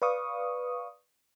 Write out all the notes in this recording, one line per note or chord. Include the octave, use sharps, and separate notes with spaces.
B4 D5 F5 C#6 D#6